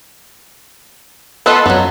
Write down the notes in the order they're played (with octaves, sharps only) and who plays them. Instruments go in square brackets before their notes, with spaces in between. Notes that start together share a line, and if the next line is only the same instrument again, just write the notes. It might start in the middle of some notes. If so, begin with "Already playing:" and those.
[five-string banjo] B3 F4 D#5 [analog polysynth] A4 B4 C6
[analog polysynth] F#2 [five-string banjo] F#3 B3